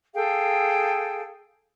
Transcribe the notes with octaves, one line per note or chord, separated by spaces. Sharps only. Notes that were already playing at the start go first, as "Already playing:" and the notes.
G#4 A4 F5 G5